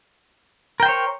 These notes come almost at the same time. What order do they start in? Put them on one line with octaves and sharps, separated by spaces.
A#4 G5 C5 C#5